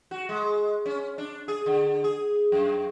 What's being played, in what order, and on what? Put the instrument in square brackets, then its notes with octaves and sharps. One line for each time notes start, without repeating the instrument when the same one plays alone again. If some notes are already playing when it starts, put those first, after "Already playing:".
[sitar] F#4
G#3
C#4
D4
G#4
D3
G#4
F#2